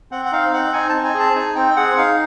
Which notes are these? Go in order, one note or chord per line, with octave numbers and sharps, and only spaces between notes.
C4 F#5
F#5
D#4 F5
C4 F#5
D#4 G#5
A5
C4
G#5
G#4
A5
D#4 G#5
C4 G5
G#4 F#5
D#4 F5